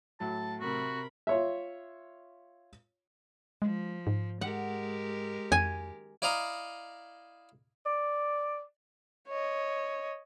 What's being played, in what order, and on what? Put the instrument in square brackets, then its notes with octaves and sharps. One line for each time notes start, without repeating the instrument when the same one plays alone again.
[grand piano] A2 F#3 [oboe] A5
[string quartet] C3 A#4 B5 [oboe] F#4
[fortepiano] F4 C#5 E5
[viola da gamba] F3 [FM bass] G#3
[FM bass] G#2
[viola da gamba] G#3 G4 A#4 [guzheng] F#5
[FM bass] F2 [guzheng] G#5
[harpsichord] E4 D5 D#5 F5 A#5 D#6
[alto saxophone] D5
[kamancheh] C#5 D#5